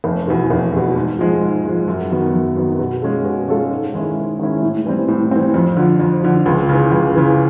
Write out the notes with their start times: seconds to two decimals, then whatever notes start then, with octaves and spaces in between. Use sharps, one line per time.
0.04 F1
0.28 E2 B2
0.50 F1
0.73 E2 B2
0.96 G#2
1.19 F3 G#3
1.41 G#2
1.65 F3 G#3
1.88 F#2
2.11 D#3 F#3 B3
2.34 F#2
2.57 D#3 F#3 B3
2.79 B2
3.02 G#3 C#4 F4 A4
3.25 B2
3.48 G#3 C#4 F4 A4
3.71 G#2
3.94 D#3 G#3 C#4 E4
4.17 G#2
4.39 D#3 G#3 C#4 E4
4.63 A2
4.86 E3 G3 C4
5.08 A2
5.31 E3 G3 C4
5.54 F2
5.77 D3 F3
6.00 F2
6.23 D3 F3
6.46 C#2
6.69 C#3 E3
6.91 C#2
7.15 C#3 E3